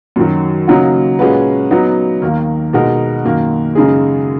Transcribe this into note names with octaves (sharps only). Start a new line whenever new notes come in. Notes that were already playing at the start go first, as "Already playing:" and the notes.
F#2 D#3 F#3
C#3 F#3 A#3 D#4 F#4
A#2 G#3 C#4 F#4 B4
F#3 B3 D#4 F#4
D#2 D#3 A#3
B2 G#3 D#4 F#4 A#4
F#2 D#3 A#3
F#2 C#3 G#3 D#4 G#4